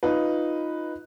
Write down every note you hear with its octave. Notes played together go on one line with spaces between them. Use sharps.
D#4 F4 B4